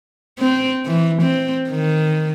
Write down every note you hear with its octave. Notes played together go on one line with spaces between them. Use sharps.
C4
E3
C4
D#3